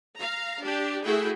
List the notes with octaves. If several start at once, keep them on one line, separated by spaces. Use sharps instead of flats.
F5 A#5
D4 G4
A3 E4 F#4 G#4 G5